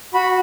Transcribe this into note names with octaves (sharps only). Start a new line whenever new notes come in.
F#4 B5